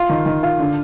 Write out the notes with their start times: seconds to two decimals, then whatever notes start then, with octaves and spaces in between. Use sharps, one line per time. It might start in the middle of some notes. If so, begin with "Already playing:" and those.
Already playing: F4 C6
0.09 D#3
0.26 D#3
0.43 F4
0.60 D3